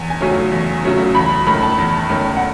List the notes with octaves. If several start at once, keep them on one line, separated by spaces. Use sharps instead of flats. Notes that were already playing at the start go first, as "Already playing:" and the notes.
Already playing: E2 G#5
G#5
C#3 F#3 A3 C#4
E2
C#3 F#3 A3 C#4
E2 B5
D#3 A3 C#4 B5
A5
E2
D#3 A3 C#4
F#5